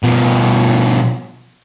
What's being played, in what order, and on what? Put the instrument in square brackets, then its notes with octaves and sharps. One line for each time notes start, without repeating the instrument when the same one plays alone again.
[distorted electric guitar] B2 F3